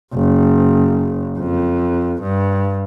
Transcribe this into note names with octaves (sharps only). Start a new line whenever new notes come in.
F#1
F2
G2